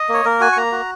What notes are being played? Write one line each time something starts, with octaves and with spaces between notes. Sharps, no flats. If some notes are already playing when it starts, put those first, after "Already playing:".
Already playing: D#5
A#3 C#5
A#3 A#4
F#4 G#5
C#6
A#3 A#5
F#4